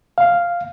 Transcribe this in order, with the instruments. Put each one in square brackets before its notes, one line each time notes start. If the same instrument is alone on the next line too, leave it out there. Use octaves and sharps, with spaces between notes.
[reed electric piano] F5